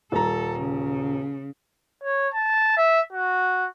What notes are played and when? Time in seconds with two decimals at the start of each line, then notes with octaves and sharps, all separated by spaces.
0.12 D#1 A4 A#5
0.59 C#3
2.04 C#5
2.34 A5
2.77 E5
3.13 F#4